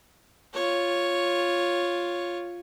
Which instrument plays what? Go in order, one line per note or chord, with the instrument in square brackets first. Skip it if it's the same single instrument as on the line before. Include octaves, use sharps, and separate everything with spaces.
[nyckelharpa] F4 C#5